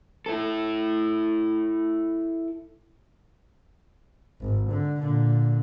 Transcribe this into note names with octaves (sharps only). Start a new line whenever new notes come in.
E4 A4
G#1
D3
A#2 D3